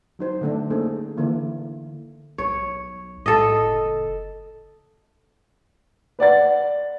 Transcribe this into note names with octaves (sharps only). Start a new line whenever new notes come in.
F#3 D#4 C5
D3 A3 D4
A#3 C#4 D#4 G#4 A4 C5
D3 E3 A#3 E4
B1 C#5
A2 A4 D#5
F#1
B4 D5 F#5 A6